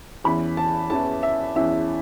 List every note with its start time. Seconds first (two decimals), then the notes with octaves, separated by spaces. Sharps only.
0.24 E2 E3 C#4 E4 B5
0.57 A5
0.90 E2 E3 C#4 E4 A5
1.23 E5
1.56 E2 E3 C#4 E4 E5